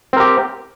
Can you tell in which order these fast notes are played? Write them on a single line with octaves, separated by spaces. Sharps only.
C4 A#4 G4